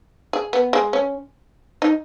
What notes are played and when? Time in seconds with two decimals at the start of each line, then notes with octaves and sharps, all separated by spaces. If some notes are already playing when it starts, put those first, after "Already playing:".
0.33 G#4
0.53 B3
0.73 G#3
0.93 C#4
1.82 D#4